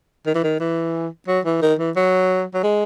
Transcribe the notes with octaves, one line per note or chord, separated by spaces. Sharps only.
D#3
E3
D#3
E3
F#3
E3
D#3
E3
F#3
F#3
G#3